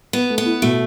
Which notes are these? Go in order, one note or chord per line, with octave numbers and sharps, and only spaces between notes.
B3 B4
A3
B3
E4
B2 A3